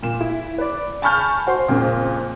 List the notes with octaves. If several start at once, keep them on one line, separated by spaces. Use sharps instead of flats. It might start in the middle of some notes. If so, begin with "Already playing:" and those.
A#2 E7
E4
B4 D5
G#5 A5 B5 C#6 F6 G6
F#4 C5 C6
F2 A#2 C#3